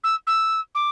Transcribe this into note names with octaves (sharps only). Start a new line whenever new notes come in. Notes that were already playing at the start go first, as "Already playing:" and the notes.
E6
E6
D6